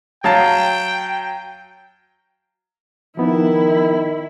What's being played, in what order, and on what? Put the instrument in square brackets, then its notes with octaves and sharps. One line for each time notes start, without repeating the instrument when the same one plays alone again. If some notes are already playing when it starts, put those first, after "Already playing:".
[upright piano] F#3 F5 A5 [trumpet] G5
[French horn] D#3 [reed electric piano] F3 B3 D#4 [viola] E4